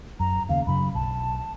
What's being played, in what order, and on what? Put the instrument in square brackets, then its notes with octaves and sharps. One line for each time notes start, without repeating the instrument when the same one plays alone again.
[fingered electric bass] F#2 [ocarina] A#5
[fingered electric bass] D#2 C#3 [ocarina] F5
[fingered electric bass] F#2 C#3 F#3 [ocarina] B5
[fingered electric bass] B1 [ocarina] A5